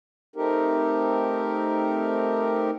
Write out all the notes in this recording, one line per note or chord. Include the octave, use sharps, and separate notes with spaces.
A3 C4 D#4 G4 A#4